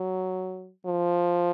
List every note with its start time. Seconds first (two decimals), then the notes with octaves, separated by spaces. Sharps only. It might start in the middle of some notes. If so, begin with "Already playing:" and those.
Already playing: F#3
0.86 F3